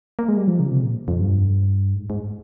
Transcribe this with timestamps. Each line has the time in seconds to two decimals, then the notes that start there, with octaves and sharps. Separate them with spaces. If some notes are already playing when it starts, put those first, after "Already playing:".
0.19 A#3
0.28 G#3
0.37 G3
0.48 F3
0.60 C#3
0.71 C3
0.84 A#2
1.08 F2
1.20 G2
1.94 G#2
2.10 G#2